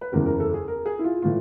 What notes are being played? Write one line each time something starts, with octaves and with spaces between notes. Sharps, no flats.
B4
F#1 E2 C#3 E3 A#4
A#4
A4
G#4
A#4
G#4
E4
F4
A2 E3 F4